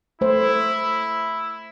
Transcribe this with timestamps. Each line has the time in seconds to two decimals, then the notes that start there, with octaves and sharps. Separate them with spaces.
0.21 A3 E4 C5